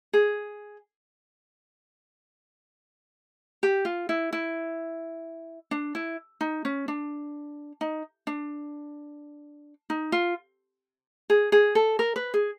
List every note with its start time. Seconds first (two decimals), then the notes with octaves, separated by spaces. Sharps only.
0.13 G#4
3.63 G4
3.85 F4
4.09 E4
4.33 E4
5.71 D4
5.95 E4
6.41 D#4
6.65 C#4
6.88 D4
7.81 D#4
8.27 D4
9.90 D#4
10.12 F4
11.30 G#4
11.52 G#4
11.75 A4
11.99 A#4
12.16 B4
12.34 G#4